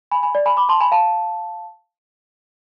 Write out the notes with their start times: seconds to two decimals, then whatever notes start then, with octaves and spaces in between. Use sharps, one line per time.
0.11 G#5 B5
0.23 G#5 B5
0.35 D5
0.46 G#5 B5
0.57 B5 D6
0.69 A5 C6
0.80 G#5 B5
0.92 F5 A5